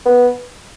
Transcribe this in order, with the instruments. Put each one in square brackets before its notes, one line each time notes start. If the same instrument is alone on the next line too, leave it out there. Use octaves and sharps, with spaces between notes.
[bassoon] B3